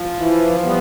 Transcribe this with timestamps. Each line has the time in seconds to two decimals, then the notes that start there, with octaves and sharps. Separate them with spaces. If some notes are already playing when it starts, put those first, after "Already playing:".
Already playing: F3
0.19 E3
0.64 G3 B3